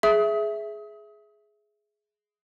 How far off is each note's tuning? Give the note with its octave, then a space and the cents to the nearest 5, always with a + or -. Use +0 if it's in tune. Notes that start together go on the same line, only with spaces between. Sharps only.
G#4 +15 E5 +0 D#6 +35